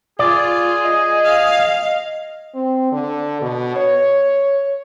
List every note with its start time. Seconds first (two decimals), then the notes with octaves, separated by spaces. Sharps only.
0.19 F4 G#4 D5
0.84 D#5
1.25 F5
2.55 C4
2.92 D3
3.42 B2
3.76 C#5